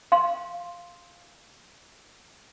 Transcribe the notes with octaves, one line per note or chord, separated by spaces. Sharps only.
F5 C6